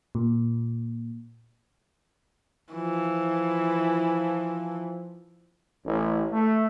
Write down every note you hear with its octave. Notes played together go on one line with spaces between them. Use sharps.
A#2
E3 F3
A1
A3